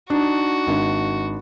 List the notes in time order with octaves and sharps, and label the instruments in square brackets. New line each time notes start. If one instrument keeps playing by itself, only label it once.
[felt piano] D4 D#4 [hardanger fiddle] F#4
[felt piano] G#1 D4